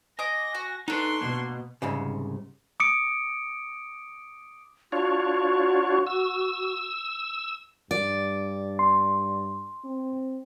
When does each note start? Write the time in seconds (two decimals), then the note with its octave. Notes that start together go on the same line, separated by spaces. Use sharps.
0.19 D#5 G#5 D6 A#6
0.55 F#4
0.88 B3 D4 D#4 A4 B4 C6 C#6
1.21 B2 A#3
1.82 C2 G#2 C#3
2.80 D6 D#6 C#7 D7
4.92 D4 F4 F#4 C#5
6.07 E6
7.91 G2 D5
8.79 C6
9.84 C4